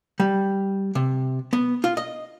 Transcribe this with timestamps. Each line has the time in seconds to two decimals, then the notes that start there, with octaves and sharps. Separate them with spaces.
0.20 G3
0.95 C3
1.53 B3
1.84 F4
1.97 D#5